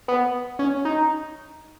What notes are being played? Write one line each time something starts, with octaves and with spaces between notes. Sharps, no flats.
B3
C#4
D#4